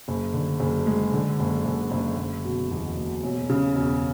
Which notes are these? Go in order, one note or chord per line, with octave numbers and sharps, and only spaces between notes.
F#1
D3
F#1
G#3
D3
F#1
F#1
F#1
F#1
B2
E2
F#1
E1
C#3
E1